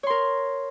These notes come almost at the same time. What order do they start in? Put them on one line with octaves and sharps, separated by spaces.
C#5 C6 A#4